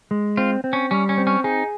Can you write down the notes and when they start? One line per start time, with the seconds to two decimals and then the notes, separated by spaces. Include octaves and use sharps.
0.11 G#3
0.37 C4 F4
0.64 C4
0.73 C#4
0.91 G3 C#4
1.09 C#4
1.18 C4
1.27 C#4
1.44 D#4 G#4